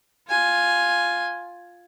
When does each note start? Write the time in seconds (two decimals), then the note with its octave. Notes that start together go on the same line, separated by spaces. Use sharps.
0.28 F4 G#5